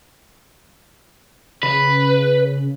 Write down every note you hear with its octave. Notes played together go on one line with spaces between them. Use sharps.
C#3 B4